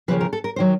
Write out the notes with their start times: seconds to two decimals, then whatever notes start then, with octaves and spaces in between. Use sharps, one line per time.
0.08 D#2 C#3 F3 B4
0.21 A#4
0.33 A4
0.44 A#4
0.56 D#3 F#3 C5